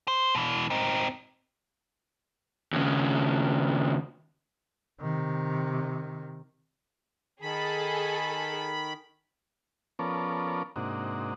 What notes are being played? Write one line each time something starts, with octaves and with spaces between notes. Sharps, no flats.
C5
B2 E3
C4 D#4
D#2 C#3
C3 D#3
D#3 G#4 A4 B5
F3 B3 C#4 A4 A#4 D5
G#2 C3 A#3 D4 D#4 F#4